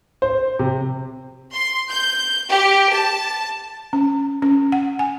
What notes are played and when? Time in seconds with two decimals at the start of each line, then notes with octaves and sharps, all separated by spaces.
0.22 C5
0.59 C3
1.55 C6
1.90 G6
2.50 G4
2.93 A5
3.93 C#4
4.42 C#4
4.72 F#5
4.99 G#5